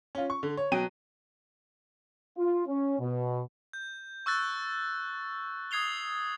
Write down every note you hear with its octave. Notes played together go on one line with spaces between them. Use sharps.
C#4 F4
C#6
D3
C#5
B2 F#3 G5 D#7
F4
C#4
B2
G6
C#6 E6 F#6 A6
D#6 G#6 C7 F7 G7